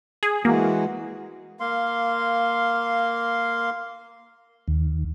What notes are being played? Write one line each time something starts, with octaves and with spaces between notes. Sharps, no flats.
G#4
E3 G#3 A#3 F#4
A#3 F5 C6
D#2